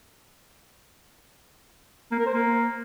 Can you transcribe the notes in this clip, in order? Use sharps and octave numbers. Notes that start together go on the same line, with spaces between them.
A#3
A#4
C5
A#3